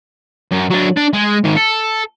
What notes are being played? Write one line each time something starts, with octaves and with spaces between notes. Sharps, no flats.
F#2
F#3 D4
D4
G#3
G#2 D#3
A4